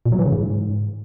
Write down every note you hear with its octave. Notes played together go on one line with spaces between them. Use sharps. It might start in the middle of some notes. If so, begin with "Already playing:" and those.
A#2
F#3
E3
C#3
G#2